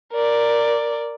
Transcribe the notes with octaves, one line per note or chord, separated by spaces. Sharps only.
A#4 D5